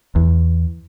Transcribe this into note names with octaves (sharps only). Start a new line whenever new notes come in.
E2